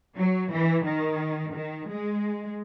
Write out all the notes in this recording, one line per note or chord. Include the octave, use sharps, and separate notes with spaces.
F#3
E3
D#3
D#3
G#3